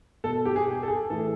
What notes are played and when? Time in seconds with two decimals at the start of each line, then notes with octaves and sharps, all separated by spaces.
0.24 B2 A4
0.45 G4
0.56 G#4
0.67 G4
0.83 A4
0.88 G#4
1.10 A2 E3 A4